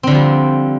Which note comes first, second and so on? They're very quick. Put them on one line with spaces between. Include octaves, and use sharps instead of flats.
C4 D3 F3 G3